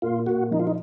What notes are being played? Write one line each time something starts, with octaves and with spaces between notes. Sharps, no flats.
A#2 F4
A#2 F#4
F3 D#4
F4
D#4